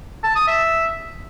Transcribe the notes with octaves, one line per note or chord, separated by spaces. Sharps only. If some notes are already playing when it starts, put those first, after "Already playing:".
A5
D#6
E5